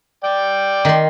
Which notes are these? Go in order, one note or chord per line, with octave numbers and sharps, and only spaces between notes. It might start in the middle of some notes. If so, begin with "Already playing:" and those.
D5 G5
D#3 C6